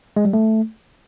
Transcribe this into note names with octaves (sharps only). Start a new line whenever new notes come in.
G#3
G3
A3